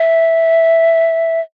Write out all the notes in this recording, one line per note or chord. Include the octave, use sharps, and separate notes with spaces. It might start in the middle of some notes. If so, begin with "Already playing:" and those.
Already playing: E5